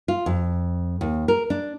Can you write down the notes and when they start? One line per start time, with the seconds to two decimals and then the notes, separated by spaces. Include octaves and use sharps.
0.08 F4
0.26 F2
1.01 D#2
1.28 A#4
1.50 D4